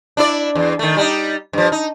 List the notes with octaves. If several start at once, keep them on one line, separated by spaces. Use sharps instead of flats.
D4 E4 D5
E2
D#3 A3
G3 D4 D#4
G2 F3
D#4